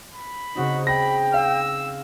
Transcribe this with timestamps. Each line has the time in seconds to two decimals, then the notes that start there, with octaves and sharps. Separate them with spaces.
0.14 B5
0.55 C#3 C4 D#4 F#4
0.87 G5 B5 A#6
1.34 F5 E6